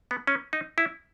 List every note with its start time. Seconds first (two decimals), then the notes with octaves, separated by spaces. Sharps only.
0.11 B3
0.27 C#4
0.53 D#4
0.78 E4